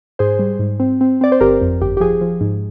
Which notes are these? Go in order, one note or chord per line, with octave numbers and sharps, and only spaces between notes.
G#2 G#4 C5
G3
G#2
C4
C4
C4 D5
C5
G1 G4 A#4
F2
G1 G4
G4
F3 G#4
F3
G#2